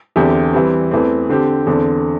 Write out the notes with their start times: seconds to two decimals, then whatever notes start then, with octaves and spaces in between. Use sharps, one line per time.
0.16 E2 D3 C4 E4 G4
0.53 E3 G3 C4
0.91 E2 E3 A3 C4
1.29 D3 C4 G4
1.67 E2 D3 C4